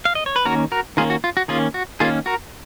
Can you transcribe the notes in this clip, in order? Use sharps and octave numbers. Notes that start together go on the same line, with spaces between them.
F5
D#5
C#5
B4
D#3 A#3 C#4 F#4 A#4
F#4 A#4
D#3 A#3 C#4 F4 G#4
F#4
F4
F#4
D#3 A#3 C#4 F4 G#4
F#4
D#3 A#3 C#4 F4 G#4
F#4 A#4